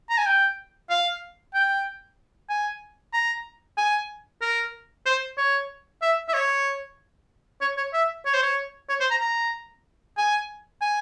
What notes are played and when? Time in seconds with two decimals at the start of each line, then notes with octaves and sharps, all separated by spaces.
0.10 A#5
0.18 G#5
0.26 G5
0.90 F5
1.54 G5
2.49 G#5
3.13 A#5
3.77 G#5
4.41 A#4
5.06 C5
5.37 C#5
6.02 E5
6.28 E5
6.34 C#5
7.61 C#5
7.77 C#5
7.93 E5
8.25 C#5
8.34 C5
8.43 C#5
8.89 C#5
9.00 C5
9.10 A#5
9.21 A#5
10.17 G#5
10.81 G#5